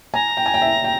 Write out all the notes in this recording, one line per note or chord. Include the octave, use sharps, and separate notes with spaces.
G#5 A#5
G5
G#5
G5
E5
G5